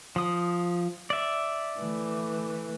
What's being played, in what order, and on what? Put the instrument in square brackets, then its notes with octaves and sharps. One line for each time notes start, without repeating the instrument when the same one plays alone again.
[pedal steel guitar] F3 D#6
D5 E5
[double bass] E3 A3